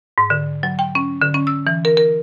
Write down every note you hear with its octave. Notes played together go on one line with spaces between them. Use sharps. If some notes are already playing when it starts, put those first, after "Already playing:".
G#2
D3
F#3
G5
C#4
D3
C#4
E6
E3
A#4
A#4